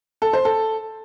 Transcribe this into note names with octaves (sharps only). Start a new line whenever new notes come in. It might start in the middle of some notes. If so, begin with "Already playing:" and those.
A4
C5
A4